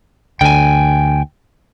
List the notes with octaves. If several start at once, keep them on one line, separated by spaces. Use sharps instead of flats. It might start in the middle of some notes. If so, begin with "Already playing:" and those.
D2 D3 G5 G#5